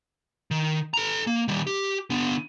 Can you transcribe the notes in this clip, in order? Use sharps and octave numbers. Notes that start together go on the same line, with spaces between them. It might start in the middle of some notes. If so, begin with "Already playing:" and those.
D#3
A4 A#5
A#3
D#3 G3
G4
D3 B3